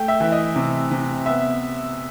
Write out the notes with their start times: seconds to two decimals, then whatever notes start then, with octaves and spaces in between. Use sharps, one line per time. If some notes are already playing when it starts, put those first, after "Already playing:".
Already playing: A3 G5
0.08 E5
0.20 E3
0.32 D#5
0.56 C3
0.91 C3
1.26 B3 E5